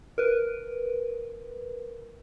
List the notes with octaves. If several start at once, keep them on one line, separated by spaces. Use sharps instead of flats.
A#4 B4